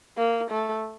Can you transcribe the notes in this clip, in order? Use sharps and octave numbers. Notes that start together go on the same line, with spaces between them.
A#3
A3